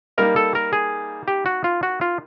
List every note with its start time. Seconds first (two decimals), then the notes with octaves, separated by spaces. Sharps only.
0.18 G3 A#3 D#4 A#4
0.36 A4
0.55 A#4
0.73 G#4
1.28 G4
1.46 F#4
1.64 F4
1.83 F#4
2.01 F4